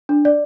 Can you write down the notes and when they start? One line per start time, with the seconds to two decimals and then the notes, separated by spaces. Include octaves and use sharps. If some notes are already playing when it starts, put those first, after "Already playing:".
0.09 D4
0.25 D5